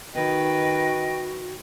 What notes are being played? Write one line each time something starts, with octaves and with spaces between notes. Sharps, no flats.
D#3 F#4 B4 D#5 G5